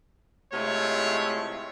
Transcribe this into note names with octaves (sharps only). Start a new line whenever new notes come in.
C3 G#3 A3 E4 F4 C#5